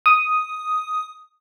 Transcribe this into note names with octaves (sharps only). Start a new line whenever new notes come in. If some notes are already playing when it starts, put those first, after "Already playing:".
D#6